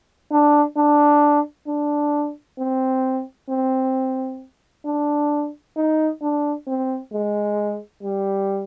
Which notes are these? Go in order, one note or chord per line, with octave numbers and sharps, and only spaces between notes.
D4
D4
D4
C4
C4
D4
D#4
D4
C4
G#3
G3